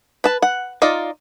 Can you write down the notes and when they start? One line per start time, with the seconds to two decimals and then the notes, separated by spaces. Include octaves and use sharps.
0.24 B4 A5
0.42 F#5
0.82 D#4 F4 D5